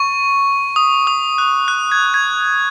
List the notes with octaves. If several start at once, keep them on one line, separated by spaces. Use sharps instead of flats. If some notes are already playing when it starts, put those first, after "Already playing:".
Already playing: C#6
D#6
D#6
F#6
F#6
G#6
G#6